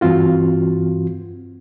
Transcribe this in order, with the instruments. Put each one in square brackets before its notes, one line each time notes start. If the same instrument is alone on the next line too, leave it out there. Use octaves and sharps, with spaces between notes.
[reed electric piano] G2 E3 C4 F4 F#4